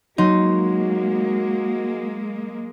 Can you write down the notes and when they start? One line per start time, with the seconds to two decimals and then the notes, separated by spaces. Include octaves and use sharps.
0.18 F#3 G#3 A#3 D#4 F#4 C6